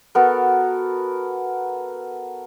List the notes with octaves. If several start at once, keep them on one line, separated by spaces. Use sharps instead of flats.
B3 F#4 A4 A#4